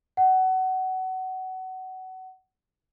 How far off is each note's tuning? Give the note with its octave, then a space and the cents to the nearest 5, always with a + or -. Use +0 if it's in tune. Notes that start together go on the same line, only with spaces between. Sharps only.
F#5 +20